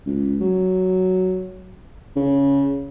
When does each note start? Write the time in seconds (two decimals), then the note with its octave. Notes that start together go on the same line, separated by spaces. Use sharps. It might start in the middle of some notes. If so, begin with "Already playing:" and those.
0.06 C#2
0.40 F#3
2.16 C#3